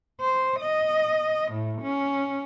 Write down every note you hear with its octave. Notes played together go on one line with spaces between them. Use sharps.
C5
D#5
A2
C#4